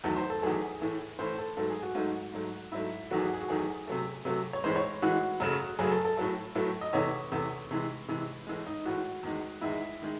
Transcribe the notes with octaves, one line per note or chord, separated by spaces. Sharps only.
E2 D#3 F#3 A3 A4
C5
A4
E2 D#3 F#3 A3 G#4
A2 E3 A3
A2 E3 A3 C5
A4
G#2 F#3 A3 A4
G#4
F#4
G#2 F#3 A3
G#2 F#3 A3
G#2 F#3 A3 E4
E2 D#3 F#3 A3 F#4
G#4
F#4
G#4
F#4
E2 D#3 F#3 A3 G#4
C3 F#3 A3
C3 F#3 A3
C#5
A2 E3 G#3 C5
C#5
A2 E3 G#3 F#4
F#2 C#3 F#3 A3
F#2 C#3 F#3 A3 G#4
A4
A4
A2 F#3 A3 A4
A2 F#3 A3
D#5
E2 C3 E3 A3 C#5
E2 C3 E3 A3
C3 E3 G#3
C3 E3 G#3
A2 E3 G#3
D#4
A2 E3 G#3 F#4
E2 D#3 G#3
E2 D#3 G#3 E4
D#3 G#3